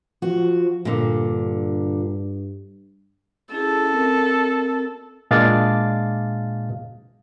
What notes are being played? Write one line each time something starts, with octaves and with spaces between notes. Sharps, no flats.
F3 F#4
G2 A#2 D3
C#4 E4 G#4 A4
C4 A#4
A#2 G#3 D4 D5 F5 A6